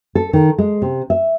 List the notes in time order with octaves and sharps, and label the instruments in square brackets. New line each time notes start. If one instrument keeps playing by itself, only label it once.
[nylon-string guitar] A4
D#3
G#3
C3
E5